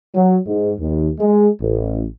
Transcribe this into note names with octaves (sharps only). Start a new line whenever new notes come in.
F#3
G#2
D#2
G#3
A1